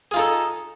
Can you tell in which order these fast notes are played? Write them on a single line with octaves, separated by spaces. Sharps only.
G#4 F4 D#4 A4